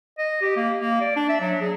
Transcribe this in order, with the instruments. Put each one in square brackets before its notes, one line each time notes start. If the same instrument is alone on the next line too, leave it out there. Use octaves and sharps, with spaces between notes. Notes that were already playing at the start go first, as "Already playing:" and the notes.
[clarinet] D#5
G4
A#3
A#3
D5
D4
E5
F#3
G#4